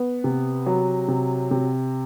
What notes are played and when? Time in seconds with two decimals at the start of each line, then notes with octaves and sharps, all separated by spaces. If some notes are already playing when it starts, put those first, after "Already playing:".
Already playing: B3
0.24 C3
0.66 F#3
1.08 C3
1.51 C3